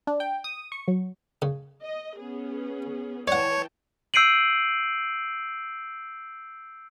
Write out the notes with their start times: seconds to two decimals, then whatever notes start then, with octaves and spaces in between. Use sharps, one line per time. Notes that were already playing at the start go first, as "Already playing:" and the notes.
0.07 D4
0.20 G5
0.44 D#6
0.72 C#6
0.88 F#3
1.42 C#3
1.84 D#5
2.18 B3 C#4 G#4
3.28 E3 C#5 D5 F#5 G5 A5
4.14 E6 G6 C7 D7 D#7 F#7